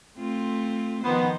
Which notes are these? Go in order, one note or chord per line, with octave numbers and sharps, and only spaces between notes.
A3 C4 F4
D#3 F3 B3 C5